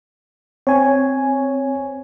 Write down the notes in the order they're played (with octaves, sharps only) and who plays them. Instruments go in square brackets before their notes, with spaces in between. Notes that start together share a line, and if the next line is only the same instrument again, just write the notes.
[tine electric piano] C4 [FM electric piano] C#5 G#5